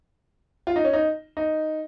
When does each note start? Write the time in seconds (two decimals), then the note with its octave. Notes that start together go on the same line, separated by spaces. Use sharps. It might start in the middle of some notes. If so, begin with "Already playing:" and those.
0.67 F4
0.76 D#4
0.84 C#4
0.93 D#4
1.37 D#4